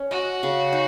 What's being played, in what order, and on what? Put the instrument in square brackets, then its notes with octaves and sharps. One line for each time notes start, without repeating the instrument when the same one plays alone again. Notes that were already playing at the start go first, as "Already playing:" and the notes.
Already playing: [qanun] C#4
[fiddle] F#4 [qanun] D#5
[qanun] C#3
D#4